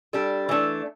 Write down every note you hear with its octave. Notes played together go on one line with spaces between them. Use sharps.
G3 D4 A4
E3 A3 D4